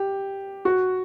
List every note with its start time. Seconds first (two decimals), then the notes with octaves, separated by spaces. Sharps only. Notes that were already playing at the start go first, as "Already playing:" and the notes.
Already playing: G4
0.65 F#4